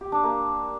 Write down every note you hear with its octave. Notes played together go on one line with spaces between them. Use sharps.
G4
D4
A#3